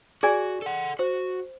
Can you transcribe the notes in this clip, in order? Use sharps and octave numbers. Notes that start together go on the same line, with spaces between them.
F#4 G#4 D5 G#5
A4 F#5
F#4 C5